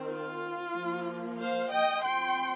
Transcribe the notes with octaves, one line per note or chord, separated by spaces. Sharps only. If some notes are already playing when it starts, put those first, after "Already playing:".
Already playing: D#3 C4
F4
F3 A#3
C5 F5
D#5 G5
F3 C4 G5 C6